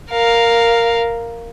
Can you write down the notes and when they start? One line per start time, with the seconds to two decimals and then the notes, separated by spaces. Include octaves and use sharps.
0.11 A#4 F5